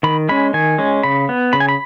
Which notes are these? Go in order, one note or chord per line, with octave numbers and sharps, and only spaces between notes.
D#3 B5
G#3 C#4 B5
D#3 G#5
G#3 C#4
C#3 B5
B3
C#3 B5
G#5
B5